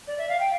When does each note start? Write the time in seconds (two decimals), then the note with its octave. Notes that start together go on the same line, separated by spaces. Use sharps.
0.07 D5
0.17 E5
0.28 F5
0.39 G5